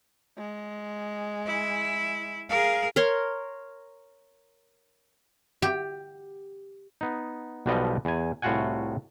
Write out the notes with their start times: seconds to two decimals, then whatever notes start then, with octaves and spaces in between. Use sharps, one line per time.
0.37 G#3
1.46 E4
2.49 G#4 A#4 F5
2.96 A#4 C#5 C6
5.62 G4
7.01 B3 D#4
7.66 B1 B2 F3 G3 B3 D#5
8.05 E2 G#5
8.42 C2 A2 F4 F#4 F#5 G#5